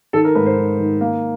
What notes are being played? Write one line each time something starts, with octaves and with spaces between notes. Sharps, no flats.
D#3 A4
A#4
G#2 B4
C5
D#3
D#3
A#3